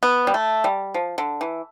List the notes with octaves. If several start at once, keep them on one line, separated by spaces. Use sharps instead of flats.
B3
G3
A3
G3
F3
D3
E3